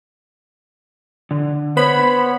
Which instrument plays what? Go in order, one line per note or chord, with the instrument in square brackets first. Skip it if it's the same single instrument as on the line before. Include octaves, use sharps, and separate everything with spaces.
[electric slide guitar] D3
[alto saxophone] B3 [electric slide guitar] C5 C#5 [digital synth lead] B5